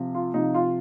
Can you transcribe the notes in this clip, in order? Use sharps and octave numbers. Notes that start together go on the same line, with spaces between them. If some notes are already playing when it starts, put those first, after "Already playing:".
Already playing: C3 F3
F4
C3 F3 D#4
F4